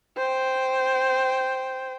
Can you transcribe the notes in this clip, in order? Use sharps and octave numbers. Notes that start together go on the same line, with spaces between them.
C5 G5